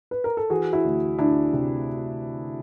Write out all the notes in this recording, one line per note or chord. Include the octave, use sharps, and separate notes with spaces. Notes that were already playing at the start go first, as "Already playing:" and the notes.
B4
A#4
A4
E3 F#4 G#4
E4 F#4
D2
D2 D4 E4
C3